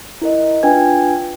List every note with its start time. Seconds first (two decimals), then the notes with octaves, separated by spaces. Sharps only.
0.22 E4 A#4 D#5
0.63 D4 F4 B4 G5 G#5 G#6